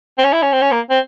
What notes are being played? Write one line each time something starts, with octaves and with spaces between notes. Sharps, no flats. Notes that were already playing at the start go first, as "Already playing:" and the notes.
C4
C#4
E4
C#4
C4
C#4
A#3
C4